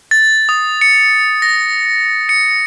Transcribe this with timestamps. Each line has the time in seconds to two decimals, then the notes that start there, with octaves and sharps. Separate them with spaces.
0.11 A6
0.49 D#6
0.81 C#7
1.42 A#6
2.29 C#7